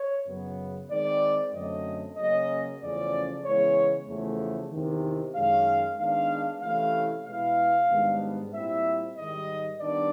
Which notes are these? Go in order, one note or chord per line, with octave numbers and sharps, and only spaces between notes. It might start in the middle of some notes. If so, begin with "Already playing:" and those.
Already playing: C#5
F#2 C#3 F#3 B3
D#3 G#3 C4 D5
F#2 D3 F#3 A3 C4 D#5
C#3 F#3 A#3 C#4 D#5
E2 C#3 F3 A3 C#4 D5
C#3 E3 G#3 B3 E4 C#5
E2 C#3 F3 A3
E2 C3 D#3
F#2 D#3 G#3 C#4 F5
D#3 G#3 B3 D4 F5
C3 E3 A3 C#4 E4 F5
B2 G#3 B3 E4 F5
G#2 D#3 G3 B3 D4
A#2 G3 C4 E4 E5
G#2 D#3 G3 D#5
D#3 G3 B3 D4 D5